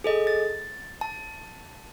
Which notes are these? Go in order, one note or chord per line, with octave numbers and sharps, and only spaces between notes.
G#4 A4 D#5
A6
A5